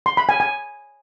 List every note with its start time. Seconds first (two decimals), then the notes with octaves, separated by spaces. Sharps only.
0.06 C6
0.17 B5
0.29 G#5
0.40 G#5